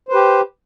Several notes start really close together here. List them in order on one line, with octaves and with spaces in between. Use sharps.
C5 B4 G4